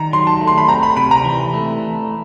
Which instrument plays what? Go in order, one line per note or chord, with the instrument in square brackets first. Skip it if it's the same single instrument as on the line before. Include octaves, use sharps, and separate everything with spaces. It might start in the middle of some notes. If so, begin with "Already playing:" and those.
Already playing: [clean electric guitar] D#3 [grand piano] A#5
[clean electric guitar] F#3 [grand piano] C6
[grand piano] A5
[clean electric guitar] A3
[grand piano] C6
B5
[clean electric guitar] C4 [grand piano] A#5
[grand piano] B5
[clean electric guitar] C3 [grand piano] B5
[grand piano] A#5
[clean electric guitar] E3
A3